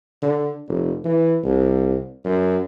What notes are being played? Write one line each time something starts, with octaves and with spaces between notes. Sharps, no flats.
D3
F1
E3
C2
F#2